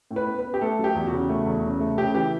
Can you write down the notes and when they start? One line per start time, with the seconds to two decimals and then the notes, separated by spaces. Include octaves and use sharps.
0.11 A2
0.16 B4
0.27 B3
0.39 B4
0.44 B3
0.54 G4
0.61 A3 A4
0.79 F#3
0.84 G4
0.95 E2
1.07 F#4
1.12 C#3
1.29 A3
1.46 E2
1.63 C#3
1.80 A3
1.98 C#3 G4
2.14 E3 G4